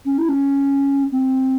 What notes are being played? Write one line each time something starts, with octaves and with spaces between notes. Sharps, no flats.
C#4
E4
C#4
C4